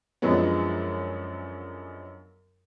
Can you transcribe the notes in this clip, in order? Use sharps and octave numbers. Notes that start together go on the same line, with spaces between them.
F#2 D3 F3 F#3 G#3 B3